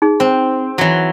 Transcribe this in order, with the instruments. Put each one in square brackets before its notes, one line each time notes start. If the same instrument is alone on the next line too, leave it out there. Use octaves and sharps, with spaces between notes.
[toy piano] D#4 G#4
[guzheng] C4 [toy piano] C5
[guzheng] E3 F#3